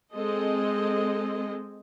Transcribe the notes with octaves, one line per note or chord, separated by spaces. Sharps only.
G#3 C4 A4 D#5